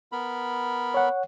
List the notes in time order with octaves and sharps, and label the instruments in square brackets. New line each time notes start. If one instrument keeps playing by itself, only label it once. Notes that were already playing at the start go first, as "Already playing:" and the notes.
[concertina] B3 A#4 B5
[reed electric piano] C#5 F#5